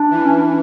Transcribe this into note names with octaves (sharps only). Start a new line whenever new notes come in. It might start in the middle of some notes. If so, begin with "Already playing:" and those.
Already playing: D4
E3
C#4
D4